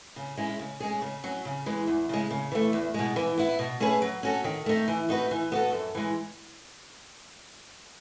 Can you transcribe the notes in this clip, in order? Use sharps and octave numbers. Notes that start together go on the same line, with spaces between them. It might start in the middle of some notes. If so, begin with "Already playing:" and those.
C#3
G#3 C#4 E4
C#3
G#3 C#4 G#4
C#3
F#3 C#4
C#3
E3 G#3
E2
C#3 G#3
C#3
E3 A3
E2
B2 G#3
E3
B3 E4
B2
A3 C#4 G#4 B4
F#3
C#4 F#4 A4
D#3
A3 D#4
E3
A3 D#4 F#4 B4
E3
B3 F#4 A4
F#2
E3 G#3